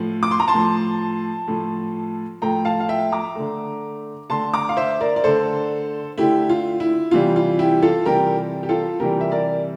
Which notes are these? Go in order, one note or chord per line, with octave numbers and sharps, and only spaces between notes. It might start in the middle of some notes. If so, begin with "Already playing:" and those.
Already playing: A2 F3 A3
D6
C6
A#5
A5 C6
A2 F3 A3
A2 F3 A3
A2 F3 A3 G5 A#5
F5 A5
F5
E5 G5
A#5 D6
D3 A3
D3 A3 A5 C6
A#5 D6
F5
C5 E5
A#4 D5
D5
D3 A3 A4 C5
D3 A3 E4 G4
F4
E4
C3 E3 G3 F4
F4
E4 G4
F4 A4
C3 E3 G3 G4 A#4
G4
F4 A4
C3 E3 G3 G4 A#4
E5
A#4 D5